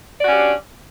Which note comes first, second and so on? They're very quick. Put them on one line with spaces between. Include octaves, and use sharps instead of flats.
D5 F#4 C#4 G4 D4